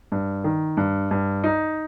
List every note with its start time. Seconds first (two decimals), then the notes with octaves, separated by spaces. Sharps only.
0.12 G2
0.44 D#3
0.77 G2
1.11 G2
1.44 D#4